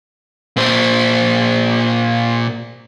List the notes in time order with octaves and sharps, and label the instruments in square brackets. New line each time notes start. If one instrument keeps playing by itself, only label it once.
[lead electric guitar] A#2 C5